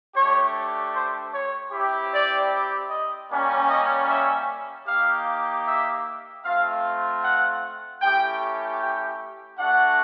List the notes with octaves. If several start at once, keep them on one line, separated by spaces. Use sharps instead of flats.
A3 D4 G4 C#5
C5
C#5
C4 E4 G4
D5
D#5
G3 A#3 C#4
D#5
E5
A#3 D#4 G4 F5
E5
A3 C4 F4 F5
F#5
A3 C#4 E4 G4 G5
G5
A3 D4 F#4 F#5